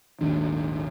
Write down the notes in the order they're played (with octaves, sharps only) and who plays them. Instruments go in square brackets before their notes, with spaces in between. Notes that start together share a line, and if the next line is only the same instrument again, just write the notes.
[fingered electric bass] D#1 G#1 D#2 D4